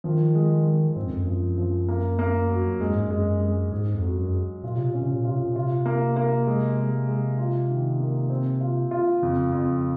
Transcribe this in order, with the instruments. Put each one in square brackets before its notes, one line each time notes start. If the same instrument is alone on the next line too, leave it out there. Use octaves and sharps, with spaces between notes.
[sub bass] D#3 [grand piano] F3
[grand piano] G#3
G#3
[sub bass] G#2 [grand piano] C4
[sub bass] F#2
F2
F#2
[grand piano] F3
F3
A#3
A#3
F#3
[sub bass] F#2 [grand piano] G#3
[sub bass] G#2
F#2
[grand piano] G#3
G#3
[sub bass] G#2 [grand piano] G#4
[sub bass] F2
[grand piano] F#3
[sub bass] F#2
[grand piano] G#4
[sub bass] A#2 [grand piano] F4
[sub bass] C3
[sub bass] A#2 [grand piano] C#4
[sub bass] C3
A#2
[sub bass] C3 [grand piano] F4
[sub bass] A#2
[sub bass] C3 [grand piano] F4
[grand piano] A#3
A#3
G#3
G#3
G#3
F4
D#3
A#3
C4
F4
F4
[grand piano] F2 [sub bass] C#3
[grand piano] F2